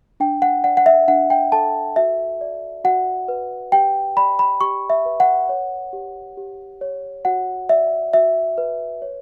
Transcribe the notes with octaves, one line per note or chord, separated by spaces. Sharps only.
D4 G5
F#5
D5 F#5
F#5
E5
D4 F#5
G5
A4 A5
F#4 E5
D5
F#4 F#5
B4
G4 G5
D5 B5
B5
G4 C#6
E5
B4
F#5
C#5
G4
G4
C#5
F#4 F#5
D5 E5
F#4 E5
B4
C#5